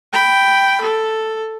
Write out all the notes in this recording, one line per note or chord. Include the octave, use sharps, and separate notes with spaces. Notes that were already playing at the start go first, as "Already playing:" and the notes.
G5 B5
A4